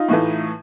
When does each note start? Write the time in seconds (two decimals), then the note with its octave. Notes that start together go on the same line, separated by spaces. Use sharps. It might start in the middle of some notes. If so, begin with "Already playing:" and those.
Already playing: D#4 F4
0.08 A2 E3 A3